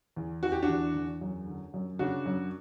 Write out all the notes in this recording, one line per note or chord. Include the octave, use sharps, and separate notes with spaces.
E2
E3 F#4
G4
D4 F#4
E2
E2
F#2
D3
F#2
C#3 D4 F#4
F#2